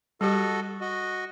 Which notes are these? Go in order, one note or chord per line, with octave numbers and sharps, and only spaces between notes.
G3 F#4 G4 A4 D#5
F#4 D#5